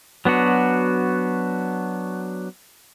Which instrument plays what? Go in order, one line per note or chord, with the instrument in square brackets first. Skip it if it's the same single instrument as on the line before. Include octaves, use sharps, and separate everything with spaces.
[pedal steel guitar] F#3 B3 D4 F#4